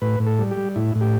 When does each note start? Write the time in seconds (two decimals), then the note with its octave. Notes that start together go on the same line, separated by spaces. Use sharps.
0.02 A2 B4
0.20 A2
0.26 A4
0.39 G3
0.51 G4
0.57 G3
0.76 A2 E4
0.95 A2
1.01 G4